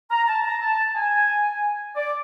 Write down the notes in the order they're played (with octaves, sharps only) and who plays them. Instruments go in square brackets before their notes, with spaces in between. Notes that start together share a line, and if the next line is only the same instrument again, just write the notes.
[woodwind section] A#5
A5
A#5
A5
G#5
D5